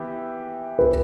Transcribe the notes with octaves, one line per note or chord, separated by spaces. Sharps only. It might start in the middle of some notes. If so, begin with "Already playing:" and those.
Already playing: E3 B3 E4 G4
B4